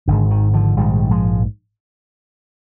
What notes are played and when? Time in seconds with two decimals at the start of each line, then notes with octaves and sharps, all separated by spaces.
0.08 G#1 G#2 D3
0.30 D#3
0.53 D3 F3
0.77 A#1 G#2 D#3 G3
1.11 F3 G#3